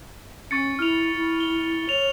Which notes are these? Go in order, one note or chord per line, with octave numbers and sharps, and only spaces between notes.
C#4 C#6 A6 C#7
E4 F6 F7
E4
G7
C#5 F7